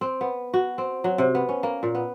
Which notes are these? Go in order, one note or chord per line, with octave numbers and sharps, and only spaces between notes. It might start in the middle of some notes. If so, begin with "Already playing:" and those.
C4
B3
F#4
C4
F#3
C3
B3
C#4
A#3
A#2
B3